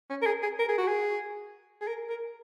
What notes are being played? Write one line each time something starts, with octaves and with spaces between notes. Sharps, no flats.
C#4
A#4
G#4
G#4
A#4
G#4
F#4
G#4
G#4
A#4
A#4